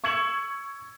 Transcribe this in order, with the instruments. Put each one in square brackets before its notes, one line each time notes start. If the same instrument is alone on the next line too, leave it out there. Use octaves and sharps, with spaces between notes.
[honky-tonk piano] C#6 E6 G#6 C#7 E7 F#7